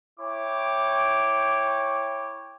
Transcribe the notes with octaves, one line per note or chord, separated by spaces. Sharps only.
E4 C#5 G5 D6